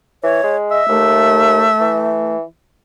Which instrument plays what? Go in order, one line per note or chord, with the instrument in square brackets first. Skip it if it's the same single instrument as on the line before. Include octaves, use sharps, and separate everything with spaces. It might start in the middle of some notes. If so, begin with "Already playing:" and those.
[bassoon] E3 [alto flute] C#5
[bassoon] G#3
[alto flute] D#5 [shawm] E5
[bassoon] D#2 [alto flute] A3
[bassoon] E3